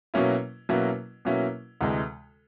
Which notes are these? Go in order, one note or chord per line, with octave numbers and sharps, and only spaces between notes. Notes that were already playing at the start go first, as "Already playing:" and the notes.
B2 F#3 A#3 C#4 E4
B2 F#3 A#3 C#4 E4
B2 F#3 A#3 C#4 E4
D2 C3 E3 G#3